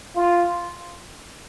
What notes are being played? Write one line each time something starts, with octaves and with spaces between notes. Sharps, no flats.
F4